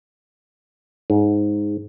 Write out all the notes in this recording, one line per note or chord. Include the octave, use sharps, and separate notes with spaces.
G#2